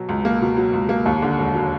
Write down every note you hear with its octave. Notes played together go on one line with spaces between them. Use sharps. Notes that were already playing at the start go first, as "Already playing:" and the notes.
Already playing: B2 F#3
C#2
A#3
B2
F#3
C#2
A#3
D#2
D3
E1
F#3